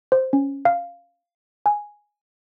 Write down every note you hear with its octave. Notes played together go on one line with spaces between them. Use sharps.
C5
C#4
F5
G#5